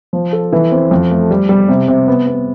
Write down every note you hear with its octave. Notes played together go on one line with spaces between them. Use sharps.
F3
A4
E3
C4
F2
A3
G3
G3
C3
C3
B3
B3